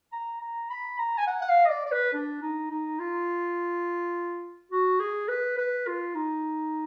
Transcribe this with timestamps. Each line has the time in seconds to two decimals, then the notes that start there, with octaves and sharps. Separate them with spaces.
0.12 A#5
0.41 A#5
0.70 B5
0.99 A#5
1.18 G#5
1.27 F#5
1.42 F#5
1.49 F5
1.65 D#5
1.70 D5
1.86 D5
1.91 B4
2.14 D4
2.42 D#4
2.70 D#4
2.99 F4
4.72 F#4
5.00 G#4
5.28 B4
5.58 B4
5.87 F4
6.15 D#4